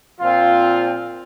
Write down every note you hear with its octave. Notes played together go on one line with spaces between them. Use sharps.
A#2 F3 C4 F4